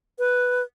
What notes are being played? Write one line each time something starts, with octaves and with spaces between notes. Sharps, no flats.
B4